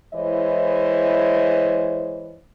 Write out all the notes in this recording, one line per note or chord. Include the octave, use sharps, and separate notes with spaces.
E3 G#3 E4 C5 C#5 D#5